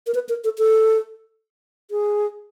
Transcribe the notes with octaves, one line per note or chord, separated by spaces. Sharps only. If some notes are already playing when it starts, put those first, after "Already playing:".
A#4
B4
A#4
A4
A4
G#4